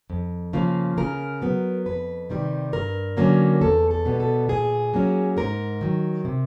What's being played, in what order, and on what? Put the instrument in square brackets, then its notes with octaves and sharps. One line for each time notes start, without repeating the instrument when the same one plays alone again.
[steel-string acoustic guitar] F2
C#3 F3 A#3
C#3 A#4
F#3 B3
F2 B4
C3 D#3 G3
G2 A#4
D3 F#3 A#3 C#4
E2 A4
A4
B2 G3 B3
A4
A#2 G#4
F#3 A#3 C#4
G#2 A#4
D#3 F#3
C3